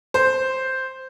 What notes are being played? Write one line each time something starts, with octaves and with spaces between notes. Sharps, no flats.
C5